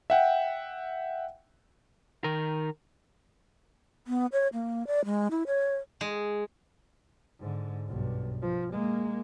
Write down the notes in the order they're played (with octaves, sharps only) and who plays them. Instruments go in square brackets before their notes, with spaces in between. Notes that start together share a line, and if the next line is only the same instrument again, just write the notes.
[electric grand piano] E5 F#5 G5
[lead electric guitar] D#3 A#4
[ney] B3
C#5
A#3
D5
G#3
E4
C#5
[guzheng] G#3
[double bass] G#2 D3
B1 G2
F3
G#3 A#3